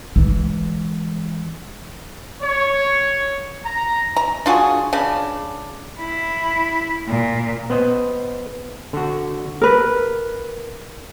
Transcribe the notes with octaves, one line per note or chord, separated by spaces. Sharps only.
E3 G#3
C#5
A#5
A#5
D4 F4 F#4 G#4
C#3 D4
E4
A#2
B3 C5 D#5
D3 F#4
A#4 B4